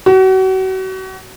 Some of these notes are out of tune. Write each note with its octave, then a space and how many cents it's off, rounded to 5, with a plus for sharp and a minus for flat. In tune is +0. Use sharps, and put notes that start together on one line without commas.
F#4 +35